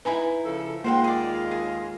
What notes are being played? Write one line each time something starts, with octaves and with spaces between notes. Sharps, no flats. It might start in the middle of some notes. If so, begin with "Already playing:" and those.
D#4 E4 B4 G#5 B5
C#3 F3 A4
D#2 G#3 A#3 F4 C5 F#5 G5
G#4 D5
G#4